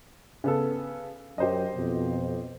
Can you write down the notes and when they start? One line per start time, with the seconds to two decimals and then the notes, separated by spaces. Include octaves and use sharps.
0.44 C#3 B3 A4
1.38 F#2 G4 C5 D#5
1.76 F2 B2